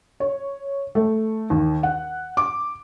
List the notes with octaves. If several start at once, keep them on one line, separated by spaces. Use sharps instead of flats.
C#5
A3
D#2
F#5
D6